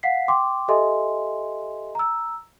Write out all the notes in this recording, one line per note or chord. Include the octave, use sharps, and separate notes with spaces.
F5 F#5 B6 C7
G5 C6 D6
G4 A4 D#5 E5 G#5 C6
A#5 E6